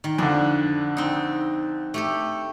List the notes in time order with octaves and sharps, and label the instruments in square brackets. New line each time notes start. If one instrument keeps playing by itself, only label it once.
[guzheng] D#3
[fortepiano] F2 D3 [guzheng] D4
[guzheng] C4 D#4
A3 G4 A4